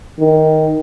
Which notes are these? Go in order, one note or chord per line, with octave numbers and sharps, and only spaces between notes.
D#3